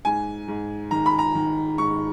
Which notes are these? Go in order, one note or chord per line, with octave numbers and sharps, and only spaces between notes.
G#2 G#5
G#2
D#3 A#5
B5
A#5
D#3
G#2 C#6